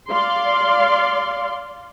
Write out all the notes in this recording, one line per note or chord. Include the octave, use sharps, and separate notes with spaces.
D5 F5 C6